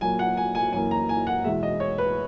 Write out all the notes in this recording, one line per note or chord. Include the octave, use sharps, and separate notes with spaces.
A#2 F#3 A#3 G#5
F#5
G#5
G#5
F#2 E3 A#3 G#5
A#5
G#5
F#5
E2 B2 G#3 E5
D#5
C#5
B4